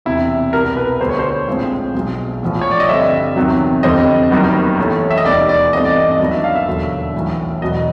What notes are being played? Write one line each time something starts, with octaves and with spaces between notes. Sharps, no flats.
E1 E2 C3 E4
C2 B2 G3 B3 A#4
B4
D2 D3 G3 B3 C5
C#5
C5
A#1 A2 F3 G#3 C4
B1 B2 G#3
A#1 A2 F3
C#5
D5
D#5
G2 D3 G3 C4 E5
E2 C3 D#3 F#3
F2 D3 G3 C4 D#5
F#1 F#2 D#3 G3 B3
A1 A2 E3 A3 C#4
E5
D#5
E1 D#2 D#3 G3 B3 D5
D5
G#1 G2 E3 A3 C4 D#5
D5
D#5
D#5
G2 D#3 F#3 B3 D4 D5
E5
F5
E5
E1 D#2 D3 F#3
B1 A2 E3
E1 E2 B2 F#3 B3 D#5